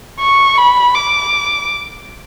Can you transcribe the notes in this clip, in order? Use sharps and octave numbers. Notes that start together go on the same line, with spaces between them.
C#6
B5
D6